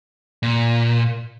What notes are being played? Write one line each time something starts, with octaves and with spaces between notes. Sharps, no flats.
A#2